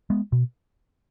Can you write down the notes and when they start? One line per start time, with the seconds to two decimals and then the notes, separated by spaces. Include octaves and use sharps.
0.10 G#3 B3
0.32 B2